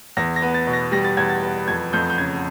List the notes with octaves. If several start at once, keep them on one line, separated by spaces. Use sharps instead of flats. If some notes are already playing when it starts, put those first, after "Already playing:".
E2 A#6
A#6
B3
A6
B2
A#6
G3 A#6
A6
E2 G#6
A6
B3
F2 G#6
F2 G6
G6
C#3 G#6